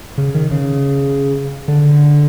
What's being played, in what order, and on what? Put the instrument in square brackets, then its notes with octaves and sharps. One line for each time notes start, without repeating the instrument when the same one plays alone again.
[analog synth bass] C#3
D#3
C#3
D3